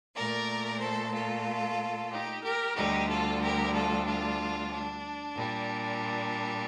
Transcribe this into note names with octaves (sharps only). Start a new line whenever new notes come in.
A#2 A3 A#4 D5
A4 C5
F4 A4
D#4 G4
G4 A#4
D2 D3 G3 D#4 G4
F4 A4
G4 A#4
F4 A4
D4 F4
D4
A#2 G3